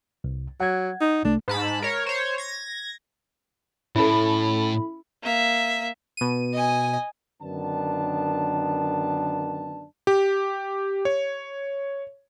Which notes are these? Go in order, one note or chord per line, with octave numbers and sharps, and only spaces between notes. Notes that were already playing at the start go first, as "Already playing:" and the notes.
C2
F#3 F#5 G#6
D#4
C2 A3 D4
G#2 A5 B5
A#4 C#5
C5 C#5
G#6 A#6
A2 C#4 E4 A4 B5
A#3 E5
B2 D#7
D#5 G#5
F#2 D3 D#3 B3 D4 A5
G4
C#5